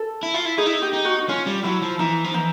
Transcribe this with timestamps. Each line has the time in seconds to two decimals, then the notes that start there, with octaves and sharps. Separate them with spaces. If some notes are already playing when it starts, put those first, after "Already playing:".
Already playing: A4
0.23 E4
0.34 F4
0.45 E4
0.58 D#4 G#4
0.66 E4
0.73 D#4
0.82 G4
0.93 D#4
1.05 F#4
1.18 F#4
1.29 C#4 F4
1.46 G3
1.63 F#3 E4
1.82 F3
1.99 E3 D#4
2.24 F3
2.34 E3 D#4